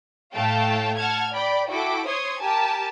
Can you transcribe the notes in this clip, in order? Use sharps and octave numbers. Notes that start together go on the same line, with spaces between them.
A2 A3 C#5 F5 G5 A5
F#5 A5 F6 G#6
D5 G5 B5
E4 F#4 A4 G5 D6
C5 C#5 C6 D#6 G#6
G4 A#4 G#5 A5